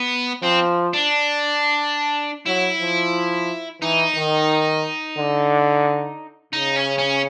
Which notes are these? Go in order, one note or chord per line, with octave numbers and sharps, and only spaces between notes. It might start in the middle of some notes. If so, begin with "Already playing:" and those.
Already playing: B3
F3 C4
D4
F#3 E4
F3
E3 D#4
D#3
D3
C#3 D#4
C#4
C#4